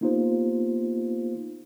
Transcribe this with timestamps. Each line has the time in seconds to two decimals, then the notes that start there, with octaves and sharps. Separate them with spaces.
0.01 A#3 B3 D#4 F4 G4 C5